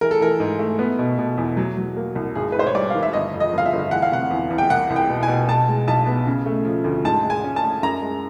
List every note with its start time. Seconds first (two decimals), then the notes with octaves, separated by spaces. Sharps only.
0.01 E3 A#4
0.11 A4
0.21 E3 A#4
0.40 G#2
0.59 A3
0.79 B3
0.99 B2
1.19 B2
1.38 E2
1.57 F#3
1.77 F#3
1.97 A#3
2.15 C2
2.35 G#1 G#4
2.52 B4
2.55 G#2 C5
2.67 C#5
2.75 G3 D5
2.90 D#3 F5
3.03 E5
3.13 G1 D#5
3.34 F2
3.40 D#5
3.53 G1 F5
3.66 E5
3.73 G1
3.91 E3 F#5
4.02 F5
4.11 C3 F#5
4.30 E2
4.50 E2
4.58 G5
4.70 C2 F#5
4.90 C2
4.96 G5
5.09 B2
5.23 G#5
5.28 B2
5.48 B2 A5
5.68 G#3
5.88 B1 A5
6.07 B3
6.27 C#3
6.46 A3
6.65 F3
6.84 D2
7.05 G#2 A5
7.24 G#3
7.30 G#5
7.44 C#4
7.56 A5
7.64 C#4
7.83 F#2 A#5
8.02 G#3